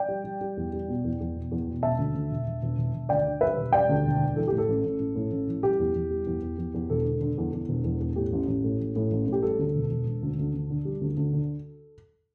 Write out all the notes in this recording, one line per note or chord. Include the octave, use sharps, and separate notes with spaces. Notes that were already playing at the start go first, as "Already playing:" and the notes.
Already playing: D5 G5
G3
G3
G3
E2
G3
B2
E2
E2
B2
E2
B2
E1 E5 A5
D2
D2
E1
E1
E1
E1
E1
D2 D5 G5
D3
G3 B4 E5
E1
G3 D5 G5
D2
E1
D3
E3 A4
A2 G4
A4
A1
A1
A1
A2
A1
E3
G3 G4
E2
E2
G3
E2
E2
E2
E2
E1 A4
D3
D3
E2
E2
E1
E2
E2
A2 G4
A1
A1
A2
A1
A2
A1
A2
G4
G3 A4
D2
E1
E1
E1
D2
D2
D2
D3
G3
D2
D2
D3